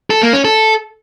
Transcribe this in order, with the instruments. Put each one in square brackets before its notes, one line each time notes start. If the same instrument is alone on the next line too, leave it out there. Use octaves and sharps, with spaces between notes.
[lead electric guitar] A4
A#3
C#4
A4